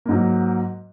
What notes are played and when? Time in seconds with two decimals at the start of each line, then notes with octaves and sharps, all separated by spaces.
0.06 A#3
0.08 G#2
0.11 F#3